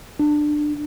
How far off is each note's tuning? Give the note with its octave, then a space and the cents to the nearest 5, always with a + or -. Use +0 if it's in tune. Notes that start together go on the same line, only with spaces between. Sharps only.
D4 +20